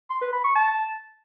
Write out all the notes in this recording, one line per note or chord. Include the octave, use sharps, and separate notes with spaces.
C6
B4
B5
C#6
A5